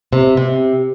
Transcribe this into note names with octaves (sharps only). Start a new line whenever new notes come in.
C3
C3